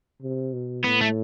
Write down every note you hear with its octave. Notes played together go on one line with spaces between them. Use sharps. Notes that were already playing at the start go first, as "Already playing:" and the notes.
C3
B2
A2 B3
A3